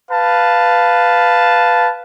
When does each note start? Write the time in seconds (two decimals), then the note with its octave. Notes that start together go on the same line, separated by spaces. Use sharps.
0.11 B4 F5 A5